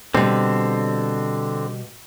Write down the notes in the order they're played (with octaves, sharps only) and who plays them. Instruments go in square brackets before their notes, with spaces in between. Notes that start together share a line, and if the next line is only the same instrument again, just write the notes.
[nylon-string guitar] B2 G3 [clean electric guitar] D3 C4